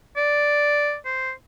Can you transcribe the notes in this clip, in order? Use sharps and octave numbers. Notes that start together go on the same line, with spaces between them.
D5
C5